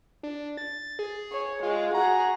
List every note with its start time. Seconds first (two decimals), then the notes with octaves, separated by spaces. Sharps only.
0.23 D4
0.57 A6
0.99 G#4
1.32 C#5
1.63 G#3 F4
1.94 F#4 G#4 A#5